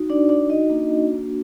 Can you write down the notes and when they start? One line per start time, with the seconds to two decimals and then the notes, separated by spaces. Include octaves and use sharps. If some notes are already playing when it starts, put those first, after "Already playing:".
Already playing: D#4 F#4
0.10 D4 D5
0.29 D4 D5
0.49 D#4 D#5
0.70 A#3 D4 F#4